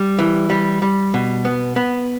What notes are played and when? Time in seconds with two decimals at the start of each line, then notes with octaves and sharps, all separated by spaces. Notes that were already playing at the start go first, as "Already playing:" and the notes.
Already playing: G3
0.19 E3
0.50 G3
0.82 G3
1.14 B2
1.45 B3
1.76 B3